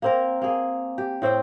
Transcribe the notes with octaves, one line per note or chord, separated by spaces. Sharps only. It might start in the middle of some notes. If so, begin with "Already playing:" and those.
A#3 C4 A#4
A#3 G#4
G4
A2 C4 C5 G5